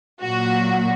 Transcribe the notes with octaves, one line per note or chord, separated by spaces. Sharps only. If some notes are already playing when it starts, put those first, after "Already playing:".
A#2 F#3 A#3 F#4